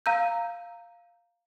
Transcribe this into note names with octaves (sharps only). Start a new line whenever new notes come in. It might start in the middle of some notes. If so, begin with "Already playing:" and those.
F5 A#5 E6 G6